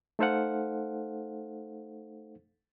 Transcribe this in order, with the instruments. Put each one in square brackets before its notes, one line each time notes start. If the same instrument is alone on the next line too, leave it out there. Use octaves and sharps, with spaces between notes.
[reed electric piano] A3 D#4 A4 C5 F5 F#5